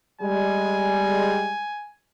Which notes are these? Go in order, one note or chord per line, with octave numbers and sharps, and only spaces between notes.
G3 G#3 G#5